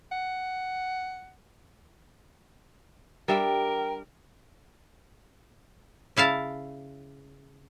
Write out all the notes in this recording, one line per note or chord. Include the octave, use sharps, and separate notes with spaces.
F#5
G3 D4 A#4 E5 G5
C#3 E4 F5 A5